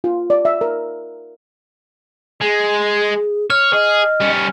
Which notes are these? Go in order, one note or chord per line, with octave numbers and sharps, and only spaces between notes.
F4
D5
E5
A#4
G#3 G#4
C#5 F6
G#4 D#5
G3 C#4